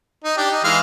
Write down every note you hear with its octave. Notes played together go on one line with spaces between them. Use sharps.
D#4
D4 G4
D#4
E3 G#3 F5